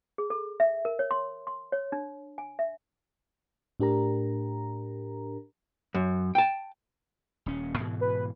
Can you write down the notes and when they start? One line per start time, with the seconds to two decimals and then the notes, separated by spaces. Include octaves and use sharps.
0.18 G#4
0.30 A4
0.60 E5
0.85 A#4
0.99 C#5
1.11 C6
1.47 C6
1.72 C#5
1.92 D4
2.38 G#5
2.59 E5
3.80 A2 D4 G4 A#4 A#5
5.95 F#2
6.35 G5 A5
7.46 D#1 C#4
7.79 G#2 B2 E3
8.01 B4